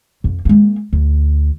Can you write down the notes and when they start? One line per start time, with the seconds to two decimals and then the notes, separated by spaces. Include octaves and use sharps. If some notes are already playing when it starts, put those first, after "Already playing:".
0.24 F2
0.45 G#3 A#3
0.93 D2